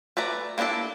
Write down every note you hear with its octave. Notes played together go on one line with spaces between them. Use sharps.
A3 B4 D5 A#5
A#3 B3 D4 E4 A4